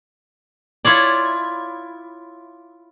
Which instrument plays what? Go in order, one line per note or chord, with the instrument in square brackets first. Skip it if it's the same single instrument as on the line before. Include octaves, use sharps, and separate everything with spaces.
[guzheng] E4 F4 C#5 D5